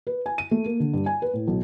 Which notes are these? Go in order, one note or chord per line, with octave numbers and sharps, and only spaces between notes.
B4
G#5
D#7
A3
A#3
D3
G2
G#5
B4
A2
B1